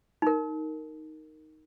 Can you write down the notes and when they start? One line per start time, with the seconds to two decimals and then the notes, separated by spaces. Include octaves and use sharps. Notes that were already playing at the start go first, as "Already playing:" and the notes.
0.22 D#4 A#4